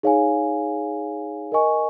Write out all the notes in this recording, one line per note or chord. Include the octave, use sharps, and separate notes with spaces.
D#4 G#4 C#5 F5 G#5
A#4 D#5 G#5 C#6